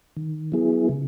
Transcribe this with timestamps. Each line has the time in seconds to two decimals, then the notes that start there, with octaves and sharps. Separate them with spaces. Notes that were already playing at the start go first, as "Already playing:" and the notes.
0.17 D#3
0.52 F#3 B3 E4 G#4
0.89 C#3